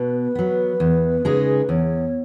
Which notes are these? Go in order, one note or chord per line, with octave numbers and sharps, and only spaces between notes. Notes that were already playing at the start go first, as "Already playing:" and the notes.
Already playing: B2 B4
F#3 B3
E2
C#3 G#3 D#4 G#4
E2 C#5